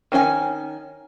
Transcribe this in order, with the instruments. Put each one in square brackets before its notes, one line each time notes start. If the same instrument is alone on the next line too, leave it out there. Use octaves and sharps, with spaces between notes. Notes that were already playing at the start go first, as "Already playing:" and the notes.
[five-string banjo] D#3 C#4 F#4 G#5